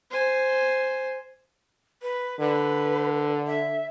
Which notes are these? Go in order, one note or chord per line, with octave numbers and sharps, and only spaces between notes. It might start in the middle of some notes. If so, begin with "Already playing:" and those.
C5 G#5
B4
D3 B4
E5